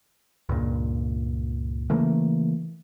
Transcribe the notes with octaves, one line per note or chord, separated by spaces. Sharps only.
C#2 G2 A#2
C#3 E3 A3 A#3